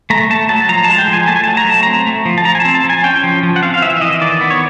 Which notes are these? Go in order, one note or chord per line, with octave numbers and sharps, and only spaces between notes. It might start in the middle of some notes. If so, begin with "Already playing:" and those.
A3 A#5
A3 A5
F#3 A5
F3 A#5
G#3 A5
G5
F3
G#5
A3 A5
G#5
F#3 A5
A#5
A3 A5
C4 A#5
A3
F3
A5
F3 A#5
G#5
C4 A5
A5
F3
G#5
C#4 G5
F3
F3
F#5
C4 F5
F5
E3 E5
E5
E3 D#5
D#3 D5
B3
C#5